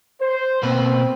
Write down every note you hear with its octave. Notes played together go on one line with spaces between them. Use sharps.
C5
B2 A#3 C4 B4